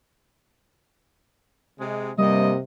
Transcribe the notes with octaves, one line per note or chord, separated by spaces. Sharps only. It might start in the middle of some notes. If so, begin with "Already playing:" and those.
C3 G#3
G2 C3 G3 A#3 D#5